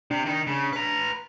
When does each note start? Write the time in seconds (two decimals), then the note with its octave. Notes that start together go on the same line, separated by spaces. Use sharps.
0.11 C3 D4
0.26 D#3 D#4
0.47 C#3
0.73 B4 A#5